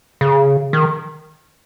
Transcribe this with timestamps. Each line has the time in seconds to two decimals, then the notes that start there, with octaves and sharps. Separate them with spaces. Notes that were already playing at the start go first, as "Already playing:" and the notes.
0.21 C#3
0.73 D#3